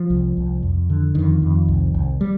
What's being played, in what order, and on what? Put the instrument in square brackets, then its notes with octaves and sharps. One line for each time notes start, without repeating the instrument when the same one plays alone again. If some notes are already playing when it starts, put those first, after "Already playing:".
Already playing: [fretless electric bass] F3
C2
C2
F2
D3
F2 D#3
F2
C2
C2
G3